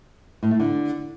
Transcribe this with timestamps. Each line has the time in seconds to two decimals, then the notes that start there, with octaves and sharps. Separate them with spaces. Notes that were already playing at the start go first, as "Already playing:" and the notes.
0.43 A2
0.51 A3
0.60 D3